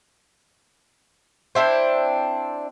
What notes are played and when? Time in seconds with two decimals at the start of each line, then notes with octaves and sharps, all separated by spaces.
1.55 C4 D4 E4 C5